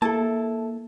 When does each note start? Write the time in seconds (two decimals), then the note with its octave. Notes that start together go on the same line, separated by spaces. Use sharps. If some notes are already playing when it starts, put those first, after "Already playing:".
0.02 A#3 E4 A4 A5